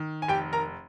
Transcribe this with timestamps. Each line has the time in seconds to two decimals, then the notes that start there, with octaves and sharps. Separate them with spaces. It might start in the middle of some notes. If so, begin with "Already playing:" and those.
Already playing: D#3
0.22 G#5
0.28 F1 G4 G5
0.53 A#4 A#5